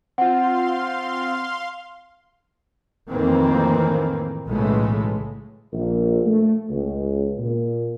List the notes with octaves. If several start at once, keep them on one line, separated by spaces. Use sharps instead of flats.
C4 F4 F5 F#5 C6
F2 A2 D#3 E3 A#3 C4
B1 A2 C#3 E3 G#3 A3
A#1
A3
C#2
A#2